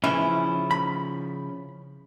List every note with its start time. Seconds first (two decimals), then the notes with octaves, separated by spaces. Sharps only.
0.04 C#3 E3 F3 C#4 E4
0.71 B5